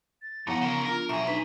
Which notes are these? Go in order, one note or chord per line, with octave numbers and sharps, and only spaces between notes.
A6
G2 F3 B3 E4 F#5 A#5
C#3 A#4
D4 F4 A#4
B1 G#4 E5 A#5
D4 D#4 B4 A#5 B6